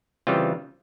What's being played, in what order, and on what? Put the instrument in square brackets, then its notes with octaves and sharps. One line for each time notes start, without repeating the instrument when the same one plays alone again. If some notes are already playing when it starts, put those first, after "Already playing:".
[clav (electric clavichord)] C#3 E3 G3 C4 F4